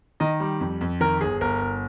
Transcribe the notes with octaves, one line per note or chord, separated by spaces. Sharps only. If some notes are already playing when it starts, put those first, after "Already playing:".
D#3 D#5
G3
F2
F2
D#3 A#4
G1 G#4
G1 A#4
G1